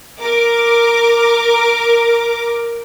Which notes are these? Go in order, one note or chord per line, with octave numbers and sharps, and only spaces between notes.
A#4 D6